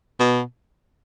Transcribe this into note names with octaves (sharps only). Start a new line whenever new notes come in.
B2